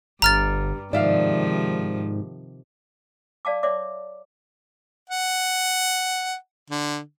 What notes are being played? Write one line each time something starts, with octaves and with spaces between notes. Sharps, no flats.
G1 G2 A#5 F6 A6
G#2 C3 D#3 F3 D5 E5 F5
D5 F5 A5 D6
C#5 D5 E5 D6
F#5
D3